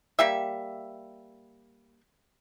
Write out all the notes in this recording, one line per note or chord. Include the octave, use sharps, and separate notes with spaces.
G3 A#3 G4 E5